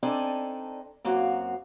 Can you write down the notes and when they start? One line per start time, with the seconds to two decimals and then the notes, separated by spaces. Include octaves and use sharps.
0.03 C4 D4 D#4 A4 D5 G#5
1.05 F#2 A#3 C4 F#4 F5